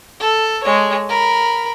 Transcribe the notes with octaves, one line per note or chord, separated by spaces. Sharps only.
A4
G#3 C#5
A#4 B5